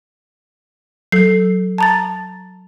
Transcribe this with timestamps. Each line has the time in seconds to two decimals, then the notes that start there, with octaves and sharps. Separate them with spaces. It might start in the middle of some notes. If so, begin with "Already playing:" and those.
1.12 F#3 A4 C7
1.78 A5 A#5 A6